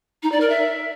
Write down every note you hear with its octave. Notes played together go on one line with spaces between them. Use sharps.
D#4
D5
A#4
E5